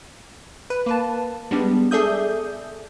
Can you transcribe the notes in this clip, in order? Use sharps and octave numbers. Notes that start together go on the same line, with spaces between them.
B4
A#3 B4 A5
G3 G#3 B3 D4 G4
G#4 A4 D5 E5 D#6 G6